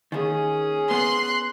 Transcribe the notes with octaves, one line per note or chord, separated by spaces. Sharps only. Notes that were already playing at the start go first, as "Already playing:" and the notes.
D#2 D#3 C#4 G#4
B3 C6 F#6